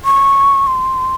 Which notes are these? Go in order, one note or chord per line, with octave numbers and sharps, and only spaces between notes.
C#6
C6